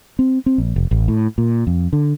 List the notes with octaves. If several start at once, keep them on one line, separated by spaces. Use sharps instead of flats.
C4
C4
A#1
F1
A1
A2
A#2
F2
D3